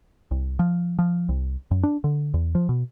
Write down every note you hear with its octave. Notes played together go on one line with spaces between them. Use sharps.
C2
F3
F3
C2
F#2
D4
D3
E2
F3
B2